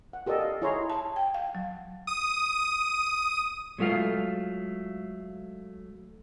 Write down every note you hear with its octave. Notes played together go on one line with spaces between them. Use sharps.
F#5
G4 A4 A#4 D5 D#5
F5
E4 G#4 C#5 D#5 A#5 C6
A5
G5
F5
F#3
D#6 D#7
F#3 G#3 A3 F4 F5